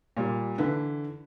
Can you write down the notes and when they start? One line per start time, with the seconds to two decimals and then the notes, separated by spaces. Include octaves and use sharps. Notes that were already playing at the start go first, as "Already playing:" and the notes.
0.17 A#2 G3
0.58 D3 E3 B4